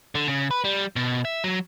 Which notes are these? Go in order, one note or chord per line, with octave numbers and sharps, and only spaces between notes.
D3
C#3
B4
G3
B2
E5
F#3